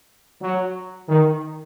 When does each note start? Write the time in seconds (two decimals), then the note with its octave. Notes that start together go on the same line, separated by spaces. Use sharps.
0.41 F#3
1.09 D#3